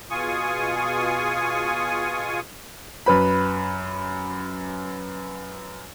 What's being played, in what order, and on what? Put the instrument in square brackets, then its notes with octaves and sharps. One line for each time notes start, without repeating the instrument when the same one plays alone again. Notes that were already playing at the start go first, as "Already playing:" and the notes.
[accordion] B2 F4 G#4 G#5 C#6 D#6
[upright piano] F#2 B4 B5